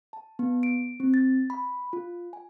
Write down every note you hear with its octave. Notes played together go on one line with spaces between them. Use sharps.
A5
B3
D7
C4
A6
B5
F4
G#5